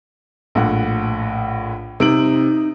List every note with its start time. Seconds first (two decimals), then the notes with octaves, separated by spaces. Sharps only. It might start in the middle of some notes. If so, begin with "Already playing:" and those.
0.55 A#1 A2 F#5
2.00 C3 D#4 D7 F#7